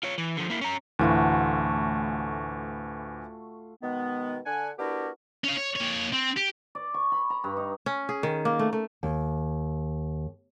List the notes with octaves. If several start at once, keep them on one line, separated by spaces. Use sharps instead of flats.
F4 C#5
E3
D3 F3
A#3 E4
C#4 A#5
D2 A2 E3 A3 F4 F#4
B2 D#3 G#3 B3
D3 D4 F#5 G#5
B3 D4 E4 F#4 G4 A#4
C#4 F5
C#5
A#3 C#5
C4
G4
D5
C#6
B5
A#5
G2
D#4
C#4
G#4
D#3
A#3
A3
A3
D#2